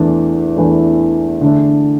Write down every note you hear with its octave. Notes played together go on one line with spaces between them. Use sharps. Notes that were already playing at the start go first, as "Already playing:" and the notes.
Already playing: E2 E3 A3 D4
E2 E3 A3 D4
D3 A3 D4